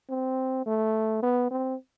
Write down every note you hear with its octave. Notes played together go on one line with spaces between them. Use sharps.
C4
A3
B3
C4